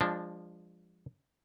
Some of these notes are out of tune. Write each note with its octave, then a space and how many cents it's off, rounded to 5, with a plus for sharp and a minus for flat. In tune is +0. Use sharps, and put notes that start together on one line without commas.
F3 +0 G#3 -25 D4 +0